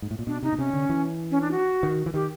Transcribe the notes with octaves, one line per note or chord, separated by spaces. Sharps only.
G#2
A2
A#2
B2 D4
C3 D#4
B2
C3 C#4
D3
E3
C#4
D4
F#4
D#3
E3
D#3 G4